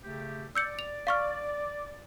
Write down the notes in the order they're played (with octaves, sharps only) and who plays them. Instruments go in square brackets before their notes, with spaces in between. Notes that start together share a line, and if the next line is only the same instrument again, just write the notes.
[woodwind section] C#3 A3 G4
[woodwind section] D5 [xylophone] E6 G6 C#7
[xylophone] F7
F5 C#6 F6